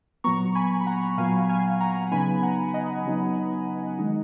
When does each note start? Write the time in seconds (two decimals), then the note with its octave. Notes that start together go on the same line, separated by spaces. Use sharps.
0.24 A#2 F#3 B3 A#5 C#6
0.55 G#5 B5
0.81 B5
0.87 F#5 A#5
1.18 A#2 F#3 B3 F5 G#5
1.49 F5 G#5
1.80 F#5 A#5
2.12 C#3 F#3 B3 D#4 G#5 B5
2.43 F#5 A#5
2.74 D#5 F#5
3.06 C#3 F#3 B3 D#4
3.99 D#3 G#3 D#4